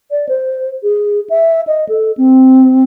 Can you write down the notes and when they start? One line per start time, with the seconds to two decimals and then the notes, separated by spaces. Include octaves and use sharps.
0.11 D5
0.29 C5
0.83 G#4
1.30 E5
1.67 D#5
1.89 A4
2.17 C4